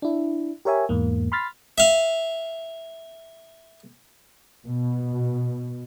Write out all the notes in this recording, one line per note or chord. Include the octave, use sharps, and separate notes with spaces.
D4 E4
G4 A#4 C#5 E5 G#5
E2 G#2 A#3
B5 C6 F6 A6 B6
E5 F5
B2